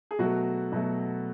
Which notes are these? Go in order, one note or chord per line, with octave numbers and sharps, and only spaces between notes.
G#4
B2 F#3 A3 F#4
B2 F#3 A3